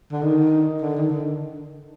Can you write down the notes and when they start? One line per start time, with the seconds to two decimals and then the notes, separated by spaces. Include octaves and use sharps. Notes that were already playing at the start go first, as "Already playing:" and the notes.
0.12 D3
0.22 D#3
0.81 D3
0.96 D#3
1.11 D3